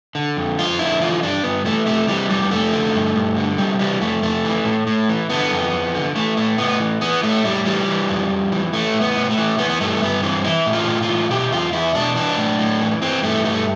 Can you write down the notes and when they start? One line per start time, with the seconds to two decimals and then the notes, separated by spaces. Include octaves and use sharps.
0.15 D3
0.37 F2
0.59 F2 F4
0.79 D3 E4
1.01 E3 F4
1.23 G2 D4
1.44 G2 B3
1.65 E3 A3
1.86 C3 A3
2.08 E3 G3
2.30 F2 G3
2.51 F2 A3
2.73 D3
2.94 G2
3.16 G2
3.37 D3
3.58 C3 G3
3.79 E3 G3
4.01 F2 A3
4.23 F2 A3
4.45 E3
4.65 A2
4.87 A2
5.09 E3
5.29 D3 B3
5.51 F2
5.73 F2
5.95 D3
6.15 E3 A3
6.37 A2 A3
6.58 A2 B3
6.80 E3
7.01 E3 B3
7.23 A2 A3
7.44 A2 G3
7.65 E3 G3
7.88 E3
8.09 F2
8.30 F2
8.52 E3
8.73 E3 A3
8.94 A2
9.01 B3
9.16 A2
9.31 A3
9.38 E3
9.58 E3 B3
9.69 B3
9.80 G2 A3
10.02 G2 B3
10.23 E3 C4
10.44 E3 E4
10.66 A2
10.73 F4
10.88 A2
11.02 F4
11.09 E3
11.30 B2 G4
11.52 E2 F4
11.73 E2 E4
11.94 B2 D4
12.16 E3 D4
12.37 A2
12.59 A2
12.81 E3
13.02 E3 C4
13.23 G2 A3
13.44 G2 A3